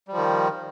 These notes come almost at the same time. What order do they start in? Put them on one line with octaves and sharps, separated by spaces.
G3 F3 D#3